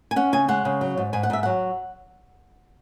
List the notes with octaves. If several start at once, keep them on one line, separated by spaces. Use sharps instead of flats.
G#5
C#4 F#5
C#3 G#5
G#3 F#5
C#3
F#3
G#2
G#2 G#5
F#5
G#2 E5
F#3 F#5